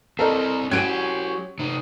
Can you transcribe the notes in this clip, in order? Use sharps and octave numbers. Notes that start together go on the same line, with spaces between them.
C4 E4 A4 A#4 D#5
F#3 C#4 E4 G4 G5 G#6 D7 D#7
C3 D#4